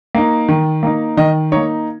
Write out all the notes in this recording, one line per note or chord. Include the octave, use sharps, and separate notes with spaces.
A#3 D#4
D#3
A#3 D#4
D#3 D#5
A#3 D#4 C#5